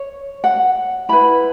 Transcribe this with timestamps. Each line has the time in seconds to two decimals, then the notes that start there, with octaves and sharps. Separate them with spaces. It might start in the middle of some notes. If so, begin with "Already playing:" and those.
Already playing: C#5
0.44 F#5
1.09 E4 B4 B5